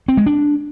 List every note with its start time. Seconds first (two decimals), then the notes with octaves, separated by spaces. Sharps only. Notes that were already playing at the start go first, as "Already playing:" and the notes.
0.08 C4
0.17 G#3
0.26 D4